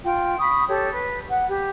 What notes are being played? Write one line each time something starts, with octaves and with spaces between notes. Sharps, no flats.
F4 G5
B5 C#6 D#6
G4 A4 C#5
B4
F#5
G4